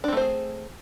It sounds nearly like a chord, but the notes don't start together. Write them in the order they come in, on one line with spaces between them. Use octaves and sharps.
D4 C4 A3 C5 G#4